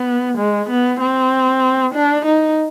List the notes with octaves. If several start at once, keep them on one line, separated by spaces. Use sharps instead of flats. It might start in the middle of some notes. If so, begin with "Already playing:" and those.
Already playing: B3
G#3
B3
C4
D4
D#4